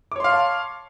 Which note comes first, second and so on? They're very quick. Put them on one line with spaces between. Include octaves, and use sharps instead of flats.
D6 C#5 C6 F5 A5